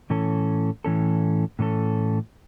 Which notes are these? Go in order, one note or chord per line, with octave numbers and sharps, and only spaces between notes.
A2 E3 C#4 A4
A2 E3 C#4 A4
A2 E3 C#4 A4